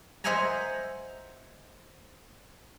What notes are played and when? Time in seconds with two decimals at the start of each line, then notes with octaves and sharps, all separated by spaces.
0.24 C5 D#5 E5 F#5 G#5 A#5